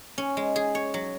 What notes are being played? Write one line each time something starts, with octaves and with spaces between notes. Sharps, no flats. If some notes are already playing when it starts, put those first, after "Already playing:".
C#4
G#3
G#4
C#5
F#3